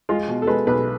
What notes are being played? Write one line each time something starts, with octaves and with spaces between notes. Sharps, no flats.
G#3 F4
B2
A4
G#3 B4
B1 B4